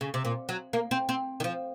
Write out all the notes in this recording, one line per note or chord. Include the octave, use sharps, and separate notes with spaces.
C#3
C3
A#2
F#3
A#3
C4
C4
D#3
F3